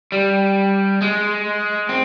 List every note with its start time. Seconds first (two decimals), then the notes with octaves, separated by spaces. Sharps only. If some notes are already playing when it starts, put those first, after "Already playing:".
0.12 G3
1.01 G#3
1.89 C4